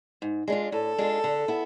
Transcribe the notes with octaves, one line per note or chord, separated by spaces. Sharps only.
G#2
G#3 D4 F4
A2 A4
G#3 D4 F4
D3
B3 E4